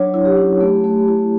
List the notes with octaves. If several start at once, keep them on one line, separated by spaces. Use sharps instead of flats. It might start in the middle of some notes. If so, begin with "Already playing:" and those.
Already playing: F#3 D4 C#5
E4
G4
C#4
A3
A3
E4